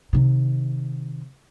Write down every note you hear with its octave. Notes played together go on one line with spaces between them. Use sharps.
C3 D#3